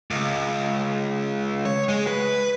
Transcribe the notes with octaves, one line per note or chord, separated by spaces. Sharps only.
C#2
C#5
G#3
B4